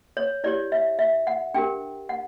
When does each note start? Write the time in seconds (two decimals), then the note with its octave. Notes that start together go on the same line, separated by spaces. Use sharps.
0.17 C#5
0.44 E4 G4 C#5 D5
0.72 E5
0.99 E5
1.27 F#5
1.54 D4 G4 A#4 G5
2.09 F#5